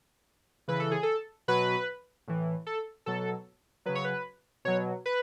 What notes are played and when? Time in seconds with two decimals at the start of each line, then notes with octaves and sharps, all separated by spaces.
0.68 C#3 E3 B4
0.80 A4
0.91 G#4
1.03 A4
1.48 B2 F#3 B4
2.28 A2 E3
2.67 A4
3.06 B2 F#3 A4
3.86 C#3 F#3 B4
3.95 C#5
4.04 B4
4.65 B2 F#3 C#5
5.06 B4